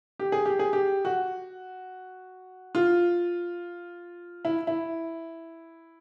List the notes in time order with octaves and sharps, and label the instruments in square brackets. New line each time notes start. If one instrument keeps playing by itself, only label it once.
[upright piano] G4
G#4
G4
G#4
G4
F#4
F4
E4
E4